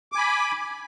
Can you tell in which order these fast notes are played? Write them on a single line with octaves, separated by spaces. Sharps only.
D6 G#5 B5